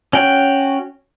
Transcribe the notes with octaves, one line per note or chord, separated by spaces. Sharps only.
C#4 F#4 G5